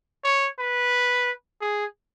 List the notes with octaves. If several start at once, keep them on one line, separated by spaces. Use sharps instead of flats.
C#5
B4
G#4